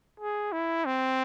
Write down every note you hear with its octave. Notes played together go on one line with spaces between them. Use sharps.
G#4
E4
C4